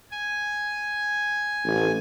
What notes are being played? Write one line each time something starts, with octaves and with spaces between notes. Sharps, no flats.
G#5
A1